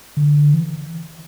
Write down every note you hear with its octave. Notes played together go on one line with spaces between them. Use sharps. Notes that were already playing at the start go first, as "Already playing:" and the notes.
D3
E3